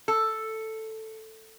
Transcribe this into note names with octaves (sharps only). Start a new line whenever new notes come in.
A4